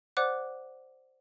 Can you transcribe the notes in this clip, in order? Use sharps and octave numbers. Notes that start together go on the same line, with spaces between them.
C5 D5 F#5 D6 F#6